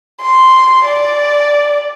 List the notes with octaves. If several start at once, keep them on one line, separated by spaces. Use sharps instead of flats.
C6
D5